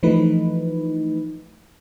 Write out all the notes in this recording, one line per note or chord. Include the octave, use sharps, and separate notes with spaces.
E3 F3 A3 D#4 B4